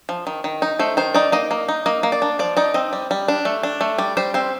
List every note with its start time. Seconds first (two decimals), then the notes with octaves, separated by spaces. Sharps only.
0.09 F3
0.27 D#3
0.44 D#3
0.62 D#4
0.79 A3 C5
0.97 D#3 C5
1.14 D#4 D5
1.32 A#3 D#5
1.51 A#3
1.68 D#4
1.86 A#3 D#5
2.03 A#3
2.12 D5
2.22 D4
2.39 F3 D5
2.57 D#4 D5
2.74 C4 D#5
2.93 G3
3.11 G3
3.28 D4
3.45 A3
3.63 D4
3.81 A3
3.98 G3 D5
4.17 G3 C5
4.34 C4 C5